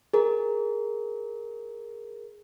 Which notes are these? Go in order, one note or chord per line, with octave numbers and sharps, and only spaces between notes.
G#4 A#4